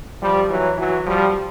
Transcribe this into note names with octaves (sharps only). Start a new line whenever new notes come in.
F3 G3
E3 F#3
E3 F#3
F3 G3